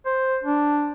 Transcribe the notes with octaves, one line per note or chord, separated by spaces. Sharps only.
C5
D4